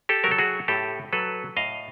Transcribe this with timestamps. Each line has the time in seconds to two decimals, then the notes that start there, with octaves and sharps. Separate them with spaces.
0.09 G4 A4
0.24 F#3 A#4
0.31 A4
0.38 F#4 G#4
0.68 A2 G4 A4
1.13 F#3 A4 B4
1.57 A2 D#5 F5